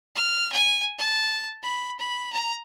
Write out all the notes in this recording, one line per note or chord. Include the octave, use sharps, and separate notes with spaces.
F6
G#5
A5
B5
B5
A#5